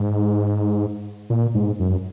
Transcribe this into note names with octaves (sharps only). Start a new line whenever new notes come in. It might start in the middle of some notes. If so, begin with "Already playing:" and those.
Already playing: G#2
A#2
G#2
F#2